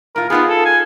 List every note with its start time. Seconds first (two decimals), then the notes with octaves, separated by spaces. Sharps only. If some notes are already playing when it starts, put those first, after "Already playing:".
0.16 A2 F4 A#4
0.30 B3 D#4 F4 G#4
0.50 A4
0.66 G#5